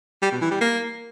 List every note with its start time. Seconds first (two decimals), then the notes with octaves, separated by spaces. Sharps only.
0.22 G3
0.32 B2
0.42 E3
0.51 G3
0.61 A#3